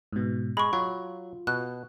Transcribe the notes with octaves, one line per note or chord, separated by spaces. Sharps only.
G#2 B2
G#3 B5 C#6
F#3 F4 C#6
B2 F#6